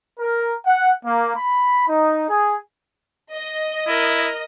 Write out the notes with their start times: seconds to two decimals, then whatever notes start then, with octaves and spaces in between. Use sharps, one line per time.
0.18 A#4
0.64 F#5
1.04 A#3
1.36 B5
1.89 D#4
2.28 G#4
3.33 D#5
3.88 E4 A#4